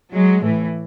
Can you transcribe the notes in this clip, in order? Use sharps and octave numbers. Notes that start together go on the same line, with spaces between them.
F#3 G#3
A2 E3